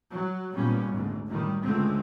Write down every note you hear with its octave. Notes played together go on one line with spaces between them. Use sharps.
F#3
G#1 A#2 G3 B3 C#4
G#1 D2 G#2
F#2 A2 D#3 G3
G#1 C#2 D3 G#3 A3 C4